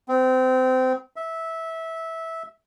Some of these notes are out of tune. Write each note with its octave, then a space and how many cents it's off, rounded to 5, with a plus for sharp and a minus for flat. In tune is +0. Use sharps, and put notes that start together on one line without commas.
C4 -25
E5 -15